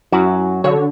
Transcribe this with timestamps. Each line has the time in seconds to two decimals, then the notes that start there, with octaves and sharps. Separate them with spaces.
0.12 F#2 F#3 E4 F#4
0.64 D3 F#4 C#5